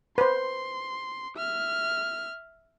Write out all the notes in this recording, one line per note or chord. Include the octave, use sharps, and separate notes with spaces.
B4 C5 C6
E5 F6